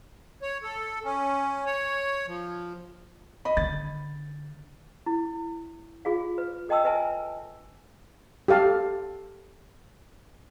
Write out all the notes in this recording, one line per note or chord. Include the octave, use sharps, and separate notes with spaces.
C#5
A4
C#4
C#5
F3
D#5 B5
D3 A6
E4
F4 G#4 F5
B4
A4 D#5 G5 A5 D#6 E6
B4 E5 G#5 A5
G4 A4 F5 A5